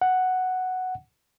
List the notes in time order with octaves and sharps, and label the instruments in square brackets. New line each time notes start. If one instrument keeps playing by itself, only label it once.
[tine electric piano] F#5